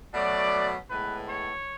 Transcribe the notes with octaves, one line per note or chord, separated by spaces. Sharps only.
B2 F#3 A3 D5
A2 G#3 B3 B4
C#5